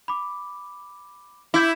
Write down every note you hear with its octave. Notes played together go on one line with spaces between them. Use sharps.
B5 D6
E4 D6 G6